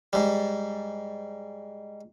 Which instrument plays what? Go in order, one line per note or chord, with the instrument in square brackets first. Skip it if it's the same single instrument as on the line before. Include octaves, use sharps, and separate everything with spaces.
[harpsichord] G#2 G3